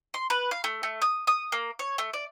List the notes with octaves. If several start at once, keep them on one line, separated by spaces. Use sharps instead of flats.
C6
B4
F5
A3
A3
D#6
D#6
A#3
C#5
A3
D5